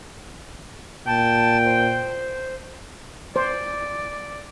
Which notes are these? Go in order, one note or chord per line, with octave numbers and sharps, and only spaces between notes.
A#2 G5 A5
C5
C5 D5